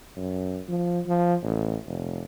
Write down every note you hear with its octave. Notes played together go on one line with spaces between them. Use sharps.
F#2
F3
F3
A1
F1